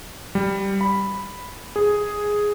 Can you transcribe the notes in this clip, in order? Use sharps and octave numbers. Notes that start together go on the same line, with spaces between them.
G3
B5
G#4